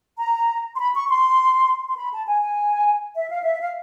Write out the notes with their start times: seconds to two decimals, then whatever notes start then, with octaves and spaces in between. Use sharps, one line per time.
0.19 A#5
0.74 C6
0.79 B5
0.94 C#6
1.08 C6
1.88 C6
1.97 B5
2.12 A5
2.27 G#5
2.42 G#5
3.16 E5
3.29 F5
3.42 E5
3.60 F5